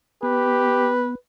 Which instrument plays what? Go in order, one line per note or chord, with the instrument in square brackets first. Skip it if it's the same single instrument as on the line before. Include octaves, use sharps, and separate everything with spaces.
[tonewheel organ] B3 [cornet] G4 [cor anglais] B4